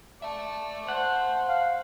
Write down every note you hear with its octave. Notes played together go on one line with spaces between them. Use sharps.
D5 E5 A5
C5 F#5
F5